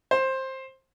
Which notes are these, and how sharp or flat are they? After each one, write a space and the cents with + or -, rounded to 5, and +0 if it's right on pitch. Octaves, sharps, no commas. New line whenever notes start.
C5 +15